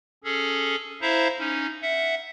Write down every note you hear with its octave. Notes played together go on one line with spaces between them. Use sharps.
C#4 G#4 A4
E4 C5 E5 F5 A#5
C#4 D#4
E5 F#5